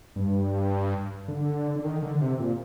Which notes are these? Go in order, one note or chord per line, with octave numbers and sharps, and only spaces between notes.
G2
D3
D3
D#3
D3
C3
A#2